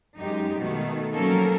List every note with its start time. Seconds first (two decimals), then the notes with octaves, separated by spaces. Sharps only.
0.17 F#2 G#3 D#4 G4
0.57 B2 D#3 A3
1.14 F3 F#3 A#3 C#4 A4 A#4